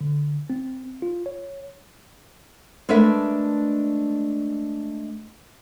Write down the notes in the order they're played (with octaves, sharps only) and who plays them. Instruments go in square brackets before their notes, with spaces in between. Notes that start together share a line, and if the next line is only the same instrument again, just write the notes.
[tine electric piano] D3
C4
F4
C#5
[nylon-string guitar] G#3 A3 D4 A#4 B4 E5